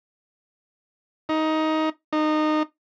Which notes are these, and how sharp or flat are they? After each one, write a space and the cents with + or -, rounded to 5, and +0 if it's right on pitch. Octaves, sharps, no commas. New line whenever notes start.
D#4 +15
D#4 -20